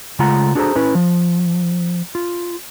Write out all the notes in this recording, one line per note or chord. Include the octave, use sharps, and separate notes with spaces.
C#3 G#3 A3 F4 F#5 A#5
D4 F#4 G#4 A4 C5 A#5
C#4 E4 B4
F3
F4